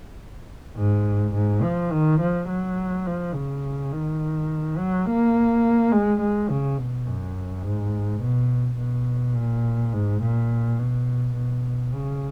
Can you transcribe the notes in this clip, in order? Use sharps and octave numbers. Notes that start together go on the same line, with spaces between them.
G#2
G#2
F3
D#3
F3
F#3
F3
C#3
D#3
F#3
A#3
G#3
G#3
C#3
B2
F#2
G#2
B2
B2
A#2
G#2
A#2
B2
B2
C#3